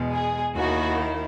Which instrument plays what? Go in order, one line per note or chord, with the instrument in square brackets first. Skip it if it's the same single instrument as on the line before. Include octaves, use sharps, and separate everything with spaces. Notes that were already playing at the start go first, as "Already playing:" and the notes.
Already playing: [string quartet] E2 B2 G#3
[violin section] G#4
[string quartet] D#2 D#3 A#3 E4 [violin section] F#4